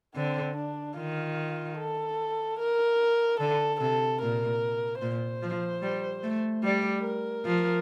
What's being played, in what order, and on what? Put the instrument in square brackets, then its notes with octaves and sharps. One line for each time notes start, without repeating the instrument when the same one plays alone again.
[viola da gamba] D3 [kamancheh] C4
[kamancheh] D4
[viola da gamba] D#3 [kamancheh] F4
[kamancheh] A4
A#4
[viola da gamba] D3 [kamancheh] A4
[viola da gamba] C3 [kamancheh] A4
[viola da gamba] A#2 [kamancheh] A#4
[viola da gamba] A#2 [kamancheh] C5
[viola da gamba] F3
G3
A3
[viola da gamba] G3 [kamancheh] D5
[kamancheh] A#4
[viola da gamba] F3